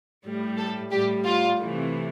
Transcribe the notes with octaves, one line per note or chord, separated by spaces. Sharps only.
A2 G3
A4
A2 G3 G4
F4
C3 E3 A3